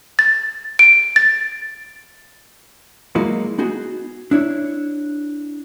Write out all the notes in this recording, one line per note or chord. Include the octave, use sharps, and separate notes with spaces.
A6
D7
A6
F#3 G#3 A#3 D#4 E4 F#4
B3 D#4 F#4 G#4
D4 E4 C#5